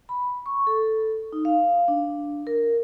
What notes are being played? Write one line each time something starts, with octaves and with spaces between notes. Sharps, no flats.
B5
C#6
A4
D#4
F5
D4
A#4